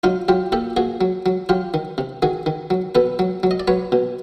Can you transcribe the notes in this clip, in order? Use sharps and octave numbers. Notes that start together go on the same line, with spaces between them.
F#3 D#4 F4
F#3 F4 G4
A#2 G4 A4
A#2 F#4 G#4
F#3
F#3
F#3 F4 G4
D#3
C3
D#3 F#4 G#4
D#3
F#3
B2 A4 B4
F#3
F#3
D#5
D5
F#3 B4 C#5
B2